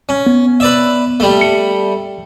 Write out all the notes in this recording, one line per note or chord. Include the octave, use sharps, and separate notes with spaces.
C#4
B3
B4 D5 E5
G3 A3
C#7